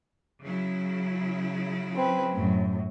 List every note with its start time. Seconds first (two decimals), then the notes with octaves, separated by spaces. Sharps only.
0.42 C#3 F#3 E4
1.94 C4 B4
2.33 F#2 A2